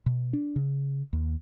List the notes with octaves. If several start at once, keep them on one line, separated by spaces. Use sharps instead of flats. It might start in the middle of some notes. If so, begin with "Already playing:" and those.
B2
D4
C#3
D#2